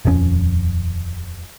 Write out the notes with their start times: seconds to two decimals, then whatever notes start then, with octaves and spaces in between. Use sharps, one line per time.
0.05 D#1 F2 F3 C#4